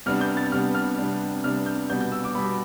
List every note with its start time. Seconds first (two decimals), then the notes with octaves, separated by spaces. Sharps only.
0.06 C3 G3 B3 D4 F6
0.21 G6
0.37 A6
0.52 C3 G3 B3 D4 F6
0.75 F6
0.98 C3 G3 B3 D4
1.44 C3 G3 B3 D4 F6
1.66 G6
1.90 B2 G3 B3 G6
2.01 G6
2.12 E6
2.24 D6
2.35 B2 G3 B3 B5